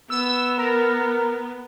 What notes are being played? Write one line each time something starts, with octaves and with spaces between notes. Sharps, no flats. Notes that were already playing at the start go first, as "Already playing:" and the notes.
B3 E6
A#4